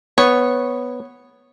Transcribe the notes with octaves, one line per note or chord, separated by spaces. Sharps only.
B3 C#5